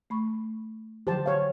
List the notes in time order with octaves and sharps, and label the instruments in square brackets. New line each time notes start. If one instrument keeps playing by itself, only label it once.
[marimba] A3 B5 C#6
[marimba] D3 F3 F#3 [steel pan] G4 C5 A5
[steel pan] C#5 F5